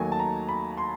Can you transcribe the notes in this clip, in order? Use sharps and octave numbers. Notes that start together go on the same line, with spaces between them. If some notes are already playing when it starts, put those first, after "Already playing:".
Already playing: D#2 D#3 F#3 A3 G#5
A5
A#5
B5
C6